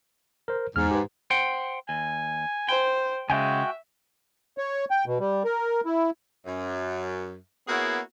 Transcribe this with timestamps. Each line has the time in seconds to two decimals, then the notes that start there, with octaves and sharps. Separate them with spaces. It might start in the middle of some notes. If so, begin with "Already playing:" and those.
0.48 A#4 C5
0.76 E2 G#2 F6
0.91 G4 B4
1.30 C5 F#5 G5
1.89 D#2 G#5
2.69 C5 G5
3.30 C#3 G#3 F#4 E5 G5 G#5
4.58 C#5
4.91 G5
5.06 B2
5.20 G3
5.45 A#4
5.85 E4
6.46 F#2
7.67 A#3 B3 C#4 E4 F#4 G#4